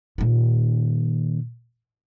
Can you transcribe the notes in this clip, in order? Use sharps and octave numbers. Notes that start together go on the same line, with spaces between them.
A#2 D#3